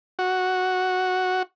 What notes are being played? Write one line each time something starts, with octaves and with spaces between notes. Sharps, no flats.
F#4